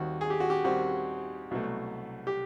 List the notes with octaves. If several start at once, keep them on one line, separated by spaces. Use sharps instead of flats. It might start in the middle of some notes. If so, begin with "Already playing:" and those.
Already playing: D#2 D#3 G3 C4 F#4
G#4
G4
F#4
G4
D#2 D#3 G3 C4 F#4
C2 B2 F#3 A3
G4